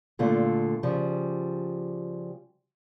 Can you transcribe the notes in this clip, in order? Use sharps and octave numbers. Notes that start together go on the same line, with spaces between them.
A#2 D3 A3 F4
C#3 F3 G3